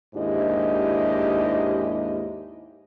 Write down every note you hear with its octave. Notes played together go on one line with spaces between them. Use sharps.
D#2 G#2 D4 E4 G4 D#5